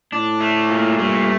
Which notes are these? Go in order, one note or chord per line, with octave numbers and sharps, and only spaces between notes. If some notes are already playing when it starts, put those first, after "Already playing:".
A2 D4
A3
A#2
G2 A3